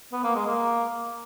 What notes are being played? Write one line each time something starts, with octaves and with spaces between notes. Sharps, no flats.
B3
A#3
G#3
A#3